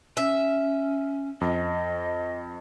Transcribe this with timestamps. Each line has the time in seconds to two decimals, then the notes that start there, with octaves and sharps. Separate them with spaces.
0.17 C#4 E5
1.41 F2 D#5